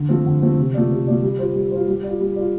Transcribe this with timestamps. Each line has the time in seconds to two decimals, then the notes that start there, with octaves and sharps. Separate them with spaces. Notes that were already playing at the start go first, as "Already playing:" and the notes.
Already playing: D3
0.09 F3 A3 C4
0.26 D3
0.42 F3 A3 C4
0.58 C3
0.74 A3 F4 D5
0.91 C3
1.07 A3 F4 D5
1.23 G3
1.39 F4 C5
1.55 G3
1.71 F4 C5
1.88 G3
2.03 F4 D5
2.20 G3
2.36 F4 D5